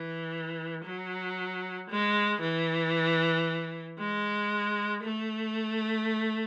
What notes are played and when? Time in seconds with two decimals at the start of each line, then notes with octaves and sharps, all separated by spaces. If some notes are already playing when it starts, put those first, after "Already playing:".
Already playing: E3
0.84 F#3
1.90 G#3
2.41 E3
3.99 G#3
5.03 A3